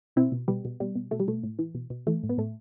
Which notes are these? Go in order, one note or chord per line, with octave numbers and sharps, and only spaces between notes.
B2 C4 E4
B2
B2 G3 B3
B2
B2 G3
B2
B2 A3
G3
B2 A3
A2
E3
B2
B2
E3 A3
A2
B3
A2 A3